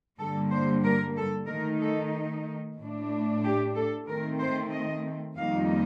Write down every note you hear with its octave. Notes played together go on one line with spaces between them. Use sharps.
G2 D3 G3 A#3 A4
C5
A#4
A4
D#3 A3 D#4 A#4
A4
A2 A3 D4
G4
A4
D#3 A3 C4 A#4
C5
D#5
F2 D#3 G3 A#3 D#4 F5